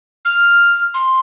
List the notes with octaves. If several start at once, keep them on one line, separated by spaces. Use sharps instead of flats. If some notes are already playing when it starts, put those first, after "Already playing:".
F6
C6